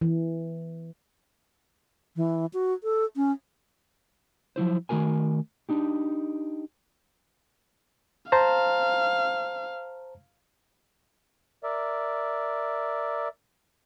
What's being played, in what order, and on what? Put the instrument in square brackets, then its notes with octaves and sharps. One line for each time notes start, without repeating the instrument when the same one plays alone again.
[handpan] E3
[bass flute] E3
F#4
A4
C#4
[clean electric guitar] F3 F#3 E4 C5
D#3 A3 F#4 A#4 G#5
D4 D#4 G4
[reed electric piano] C5 A5 A#5 [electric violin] F5
[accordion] A#4 D5 E5